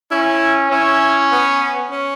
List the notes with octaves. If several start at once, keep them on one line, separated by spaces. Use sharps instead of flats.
C#4 E4
C#4 E4
B3
C#4